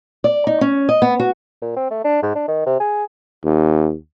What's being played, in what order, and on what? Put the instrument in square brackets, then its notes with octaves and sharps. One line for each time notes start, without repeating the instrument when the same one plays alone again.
[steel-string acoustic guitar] D5
D#4
C#4
D#5
B3
F#4
[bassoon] A#2
C4
A3
D4
G#2
D4
D#3
C3
G#4
[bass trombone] D#2